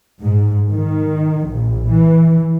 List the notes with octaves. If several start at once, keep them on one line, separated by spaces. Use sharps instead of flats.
G#2
D#3
A#1
E3